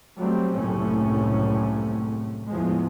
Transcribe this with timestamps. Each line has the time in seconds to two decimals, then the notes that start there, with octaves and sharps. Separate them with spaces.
0.18 F#3 G3 A3 C4
0.54 F#1 C2 A2 C3 A3 C#4
2.49 E2 A2 F3 G#3